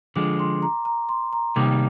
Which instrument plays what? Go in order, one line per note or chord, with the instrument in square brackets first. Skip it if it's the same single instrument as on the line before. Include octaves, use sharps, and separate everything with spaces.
[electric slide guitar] D3 F3 G#3 [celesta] D6
[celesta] C6
A#5
A#5
C6
A#5
[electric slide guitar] C3 D#3 G3 A#3 D#4 [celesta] D6